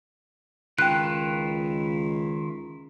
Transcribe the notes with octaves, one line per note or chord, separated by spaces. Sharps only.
C#2 D#3 E4 F4 G5 F#6